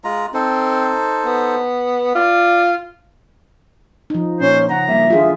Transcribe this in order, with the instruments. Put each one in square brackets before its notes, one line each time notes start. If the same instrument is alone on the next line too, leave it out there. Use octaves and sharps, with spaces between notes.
[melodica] G#3 F4 A#5
[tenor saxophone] C4 [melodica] D#4 A4 C5
[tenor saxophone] B3
[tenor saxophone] F4 [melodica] D5
[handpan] F3 D#4
[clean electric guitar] A#2 [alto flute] C#4 [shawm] C5
[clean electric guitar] C#3 [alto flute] F#5 [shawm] A#5
[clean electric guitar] C#3 G3 A#3 [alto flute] E5
[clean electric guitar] G2 D3 D#3 [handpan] F4 G#4